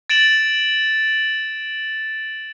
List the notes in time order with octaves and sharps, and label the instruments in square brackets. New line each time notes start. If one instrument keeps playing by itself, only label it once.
[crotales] A6 D7 E7 F#7